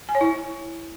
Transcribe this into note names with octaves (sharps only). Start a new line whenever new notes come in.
G#5
C#5
E4